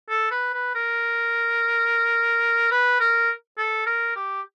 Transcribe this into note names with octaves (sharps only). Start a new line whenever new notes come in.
A4
B4
B4
A#4
B4
A#4
A4
A#4
G4